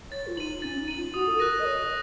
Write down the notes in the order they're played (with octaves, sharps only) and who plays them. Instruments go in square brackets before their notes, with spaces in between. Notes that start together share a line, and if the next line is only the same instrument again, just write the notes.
[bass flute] C#5 [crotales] A6
[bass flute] F4
[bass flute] D#4 [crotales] D#7 F#7
[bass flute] C#4 [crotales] A6
[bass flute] D#4
[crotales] D#7 F#7
[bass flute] F4
[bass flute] F#4 [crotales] D#6
[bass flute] A4
[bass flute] A#4 [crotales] F#6 A#6 D#7
[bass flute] A#4
D#5
[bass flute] C#5 [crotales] D#6